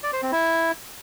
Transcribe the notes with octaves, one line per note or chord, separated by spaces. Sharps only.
D5
C5
C4
E4